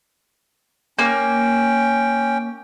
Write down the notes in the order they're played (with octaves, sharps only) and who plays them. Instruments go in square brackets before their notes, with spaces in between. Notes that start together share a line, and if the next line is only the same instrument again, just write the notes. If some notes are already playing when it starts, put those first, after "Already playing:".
[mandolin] A#3 [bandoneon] C#4 G5